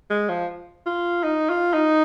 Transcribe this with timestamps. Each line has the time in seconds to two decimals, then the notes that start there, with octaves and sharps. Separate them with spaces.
0.10 G#3
0.29 F3
0.86 F4
1.23 D#4
1.49 F4
1.74 D#4